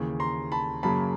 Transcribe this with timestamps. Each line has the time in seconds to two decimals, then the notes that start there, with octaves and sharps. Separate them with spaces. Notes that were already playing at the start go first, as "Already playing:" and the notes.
Already playing: D#2 C#3 E3
0.20 A#5 C6
0.52 A5 B5
0.83 F#2 C#3 F#3 A#3 A5 B5